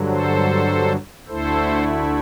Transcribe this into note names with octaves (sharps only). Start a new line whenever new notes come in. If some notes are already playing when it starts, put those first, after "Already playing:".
Already playing: G2 D3 F#3
A4 C5
D2 D3 A3 E4 A4 C5